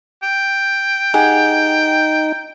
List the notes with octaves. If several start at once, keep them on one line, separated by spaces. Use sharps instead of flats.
G5
D#4 G4 G#4 F#5